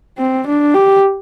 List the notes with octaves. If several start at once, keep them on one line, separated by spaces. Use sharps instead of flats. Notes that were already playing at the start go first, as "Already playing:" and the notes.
C4
D4
G4